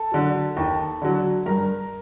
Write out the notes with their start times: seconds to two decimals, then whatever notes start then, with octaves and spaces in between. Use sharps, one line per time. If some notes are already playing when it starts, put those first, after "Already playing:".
Already playing: A4 A5
0.12 D3 F#3
0.57 D#2
1.02 D3 F#3
1.46 G2 A#4 A#5